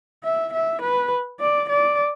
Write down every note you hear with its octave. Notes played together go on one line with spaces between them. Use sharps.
E5
E5
B4
D5
D5